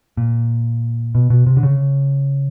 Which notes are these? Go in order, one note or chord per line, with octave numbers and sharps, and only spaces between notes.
A#2
B2
B2
C3
D3
C#3